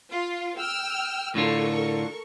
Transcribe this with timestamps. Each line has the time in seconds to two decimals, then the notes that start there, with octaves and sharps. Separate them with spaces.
0.10 F4
0.58 G5 E6 F6
1.35 A2 D3 F4 A4 A#4 C#6